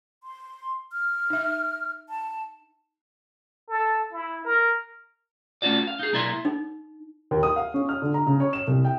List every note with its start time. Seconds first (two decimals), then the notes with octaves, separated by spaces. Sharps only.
0.24 C6
0.92 F6
1.30 D#4 E5
2.09 A5
3.69 A4
4.11 E4
4.45 A#4
5.62 A3 C#4 F4 F#4 D5
5.88 F5
5.99 D#4 G#4
6.13 B1 A#3 E4 D5 E5 C6
6.45 D#4
7.31 D#2
7.43 D#6
7.56 F5
7.74 C#4
7.89 F6
8.02 D3
8.14 A#5
8.27 C#3
8.40 C#5
8.53 E7
8.67 C2
8.85 G5